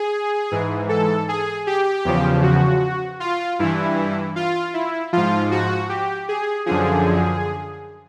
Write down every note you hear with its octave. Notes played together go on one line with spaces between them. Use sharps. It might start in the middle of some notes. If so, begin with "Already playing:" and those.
Already playing: G#4
G#2 E3
A4
G#4
G4
E2 C#3 F3
F#4
F4
G2 E3 E4
F4
E4
G#2 F3 F4
F#4
G4
G#4
F#2 D3 F3 G#4